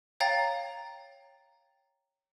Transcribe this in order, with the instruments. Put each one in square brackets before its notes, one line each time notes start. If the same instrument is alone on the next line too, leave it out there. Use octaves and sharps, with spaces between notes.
[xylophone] C#5 F5 G5 A#5 A6